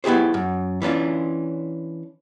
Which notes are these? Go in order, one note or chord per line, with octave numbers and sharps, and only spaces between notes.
B3 E4 G4 G#4 C5
F#2
E3 C#4 D4 F4